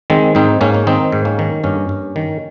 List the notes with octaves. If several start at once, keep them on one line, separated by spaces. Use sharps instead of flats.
D#3 G#3 C4
G#2 C4 D#4
G#2 A#3 C#4
C#4
D#3 C4 D#4
G#2
A#3 C#4
D#3
G2 A#3 C#4
G2
D#3